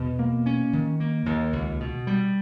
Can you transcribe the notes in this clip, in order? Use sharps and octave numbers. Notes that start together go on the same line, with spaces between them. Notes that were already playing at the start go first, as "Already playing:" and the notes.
Already playing: E2 B2
A#3
C#4
D#3
A#3
D#2
C#2
B2
G3